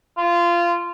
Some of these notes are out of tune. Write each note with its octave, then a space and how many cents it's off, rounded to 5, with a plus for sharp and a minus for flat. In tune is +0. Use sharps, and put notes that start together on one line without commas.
F4 -20